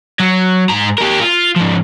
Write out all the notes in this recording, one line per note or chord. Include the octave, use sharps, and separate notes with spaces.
F#3
G#2 A#5
G4 A#4
F4
G#2 F3